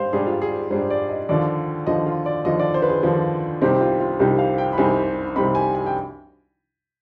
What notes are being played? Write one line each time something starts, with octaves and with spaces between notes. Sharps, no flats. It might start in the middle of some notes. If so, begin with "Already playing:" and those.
Already playing: G#2 G3 C5 F5
G#2 G3 D4 G#4
F4
G#4
G#2 G3 D4 C5
D5
D#5
D#2 D3 F3 D5
D#2 D3 F3 D#5
F4
D5
D#2 D3 F3 D#5
D5
C5
B4
G#4
D#2 D3 F3
C2 C3 G3 C4 D#4 G4
F4
F4
C2 C3 G3 C4 D#4 G4
F5
G5
B5
C2 C3 G3 C4 D#4 G#5
C2 C3 G3 C4 D#4 B5
G#5
G#5
G5